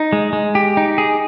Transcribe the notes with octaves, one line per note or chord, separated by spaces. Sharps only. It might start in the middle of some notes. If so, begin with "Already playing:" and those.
Already playing: D#4
G#3
G#3
G4
D#4
G#4